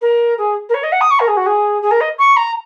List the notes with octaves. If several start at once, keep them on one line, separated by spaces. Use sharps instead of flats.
A#4
G#4
A#4
C#5
D#5
F#5
D#6
C#6
A#4
G#4
F#4
G#4
G#4
A#4
D#5
C#6
A#5